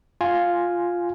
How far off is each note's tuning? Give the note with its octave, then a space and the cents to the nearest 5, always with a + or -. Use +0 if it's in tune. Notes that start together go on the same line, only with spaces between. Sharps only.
F4 +0 G#5 +0